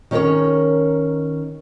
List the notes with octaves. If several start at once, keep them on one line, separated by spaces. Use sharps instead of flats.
D#3 C#4 G#4 A#4 C#5